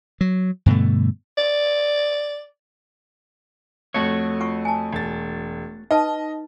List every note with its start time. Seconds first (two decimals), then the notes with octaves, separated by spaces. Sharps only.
0.21 F#3
0.66 G2 B2 D3 A3
1.37 D5
3.94 F2 A3 F#4 C#5
4.40 F4 F#5 C#6
4.65 G#5 A5
4.93 E1 A6
5.91 D#4 B4 D#5 A5